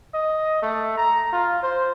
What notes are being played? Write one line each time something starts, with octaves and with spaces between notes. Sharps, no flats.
D#5
A3
A#5
F4
C5